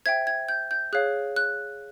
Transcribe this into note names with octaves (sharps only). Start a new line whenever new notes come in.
C5 E5 G5 G#6
G#6
G6
G6
G#4 C#5 F5 F#6
F#6